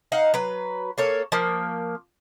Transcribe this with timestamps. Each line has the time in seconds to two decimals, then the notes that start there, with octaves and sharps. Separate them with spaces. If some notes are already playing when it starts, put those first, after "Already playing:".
0.12 D#4 F5 F#5
0.34 F#3 B4
0.98 A#3 A4 C#5
1.32 F3 A#3